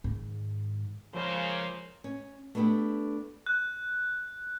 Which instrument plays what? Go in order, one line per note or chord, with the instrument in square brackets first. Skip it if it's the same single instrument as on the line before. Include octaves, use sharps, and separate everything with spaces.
[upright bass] G#2 D#3
[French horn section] C#3 A#3 [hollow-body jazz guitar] F3 G#3 [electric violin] C5
[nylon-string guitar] C#4
A3 B3 D4 E4 G4
[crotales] F#6